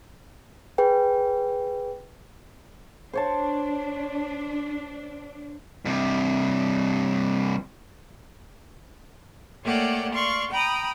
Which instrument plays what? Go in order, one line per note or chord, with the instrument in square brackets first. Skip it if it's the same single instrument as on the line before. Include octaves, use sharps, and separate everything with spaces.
[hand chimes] G#4 B4 G5
[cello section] D4 [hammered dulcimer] C5 C#5 A5
[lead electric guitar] G2 C3
[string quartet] A3 A#3 G4 C#5 D5 F#5
D5 F5 C6 C#6
G5 A#5 B5 D#6